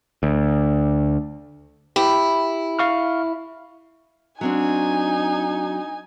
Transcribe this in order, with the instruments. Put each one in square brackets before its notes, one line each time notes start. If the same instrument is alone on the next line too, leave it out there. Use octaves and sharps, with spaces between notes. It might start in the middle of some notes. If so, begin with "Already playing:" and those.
[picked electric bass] D2
[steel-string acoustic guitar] E4 [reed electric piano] G4
[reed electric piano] F5 C#6 F6
[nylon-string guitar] F#3 C4 D4 [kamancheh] D#4 G#5